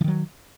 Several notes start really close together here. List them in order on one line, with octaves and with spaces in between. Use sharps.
E3 D#3 F#3